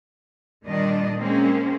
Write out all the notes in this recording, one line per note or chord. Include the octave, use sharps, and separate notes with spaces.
A#2 D#3 G3 D4 D#5
G#3 A#3 C4 C#4